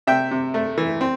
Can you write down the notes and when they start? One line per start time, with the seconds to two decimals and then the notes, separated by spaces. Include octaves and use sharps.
0.07 C3 E5 G5
0.31 C3
0.54 A3
0.78 E3
1.01 C4